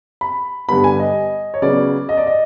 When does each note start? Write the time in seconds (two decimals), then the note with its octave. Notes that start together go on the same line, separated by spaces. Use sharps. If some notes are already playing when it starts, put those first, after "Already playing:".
0.21 B5
0.68 G2 D3 G3 B3 B5
0.84 G#5
1.00 D#5
1.54 C#5
1.62 C#3 F#3 B3 D5
2.09 D#5
2.17 D5
2.27 D#5